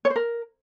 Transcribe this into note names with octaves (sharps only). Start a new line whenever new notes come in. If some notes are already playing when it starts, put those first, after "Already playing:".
C#5
C5
A#4